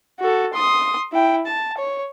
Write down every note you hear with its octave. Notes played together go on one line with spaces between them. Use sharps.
F#4 A4
C6 D#6
E4 G5
A5
C#5